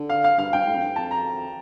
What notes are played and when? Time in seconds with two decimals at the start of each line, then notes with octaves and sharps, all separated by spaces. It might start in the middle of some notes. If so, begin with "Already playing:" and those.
Already playing: D3
0.10 F5
0.24 F5
0.38 G2 F5
0.53 G2 G5
0.67 A2
0.75 F2
0.82 G2
0.96 F2 A5
1.11 A#5